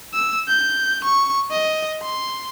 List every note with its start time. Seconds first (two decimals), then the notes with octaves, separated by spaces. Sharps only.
0.14 E6
0.48 G6
1.04 C#6
1.51 D#5
2.02 C6